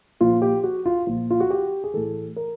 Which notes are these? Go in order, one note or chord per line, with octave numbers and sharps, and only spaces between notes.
A#2 F3 F4
G4
F#4
F4
A#2 F3
F4
F#4
G4
G#4
A2 E3 A4
A#4